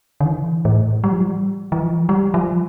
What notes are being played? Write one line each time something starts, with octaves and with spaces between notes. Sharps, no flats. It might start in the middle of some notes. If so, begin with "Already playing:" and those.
D3
E3
A2
G3
F3
G3
E3
F3
G3
F3